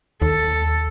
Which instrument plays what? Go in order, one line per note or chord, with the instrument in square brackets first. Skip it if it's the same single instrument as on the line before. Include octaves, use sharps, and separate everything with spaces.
[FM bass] D#2 [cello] A4